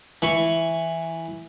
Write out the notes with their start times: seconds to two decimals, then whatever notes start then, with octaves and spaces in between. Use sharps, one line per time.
0.22 E3 C#6